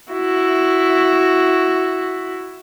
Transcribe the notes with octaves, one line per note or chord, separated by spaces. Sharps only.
E4 F#4